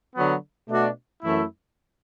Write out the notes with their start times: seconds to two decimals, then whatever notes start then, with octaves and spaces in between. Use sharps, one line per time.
0.15 D3 F#3 B3
0.69 B2 A3 D4 F#4
1.23 F#2 E3 A3 E4